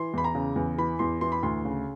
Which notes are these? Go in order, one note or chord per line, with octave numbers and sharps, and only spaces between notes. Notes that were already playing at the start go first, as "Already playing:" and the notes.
Already playing: E3 C6
E2 B5
A#5
C#3
E2
E3 B5
E2 C6
E3 C6
B5
D2 C6
C#3